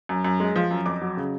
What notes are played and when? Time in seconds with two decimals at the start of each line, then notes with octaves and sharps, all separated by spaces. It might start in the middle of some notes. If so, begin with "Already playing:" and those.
0.09 F#2
0.25 F#2
0.40 G#3
0.56 F3
0.71 F#2
0.86 F2 D6
1.02 F#3
1.17 C#3